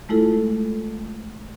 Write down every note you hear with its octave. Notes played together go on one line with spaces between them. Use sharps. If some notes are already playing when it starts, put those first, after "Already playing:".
G#3 A3 E4 F4 A4